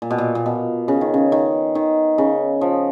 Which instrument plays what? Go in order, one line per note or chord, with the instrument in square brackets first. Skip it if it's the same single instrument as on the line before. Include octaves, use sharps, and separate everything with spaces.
[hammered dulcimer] A#2
B2
A#2
A#2
B2
C#3
D#3
C#3
D#3
D#3
C#3
F3